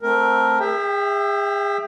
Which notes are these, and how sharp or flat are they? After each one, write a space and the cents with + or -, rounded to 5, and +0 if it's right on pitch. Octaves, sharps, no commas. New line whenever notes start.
A3 +0 C4 +0 A#4 +10
G#4 -35 E5 +0 G5 +15